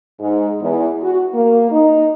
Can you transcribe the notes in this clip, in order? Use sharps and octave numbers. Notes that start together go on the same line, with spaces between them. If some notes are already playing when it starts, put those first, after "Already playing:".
G#2
E2
F#4
A#3
D#4